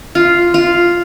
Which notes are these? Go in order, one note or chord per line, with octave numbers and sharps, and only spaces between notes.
F4
F4